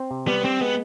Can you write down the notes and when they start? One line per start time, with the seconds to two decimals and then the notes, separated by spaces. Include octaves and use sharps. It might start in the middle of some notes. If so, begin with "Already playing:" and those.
Already playing: C4
0.11 C3
0.27 G3 B3
0.45 C4 G4
0.61 G#3 B3